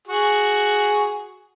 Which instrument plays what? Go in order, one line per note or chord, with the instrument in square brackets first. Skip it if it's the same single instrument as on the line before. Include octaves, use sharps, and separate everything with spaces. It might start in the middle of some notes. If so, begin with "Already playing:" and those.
[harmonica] F#4 G#4